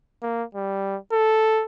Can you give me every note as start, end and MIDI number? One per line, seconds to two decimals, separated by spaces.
0.23 0.43 58
0.55 0.97 55
1.12 1.65 69